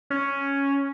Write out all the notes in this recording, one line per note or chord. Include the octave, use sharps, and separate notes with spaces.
C#4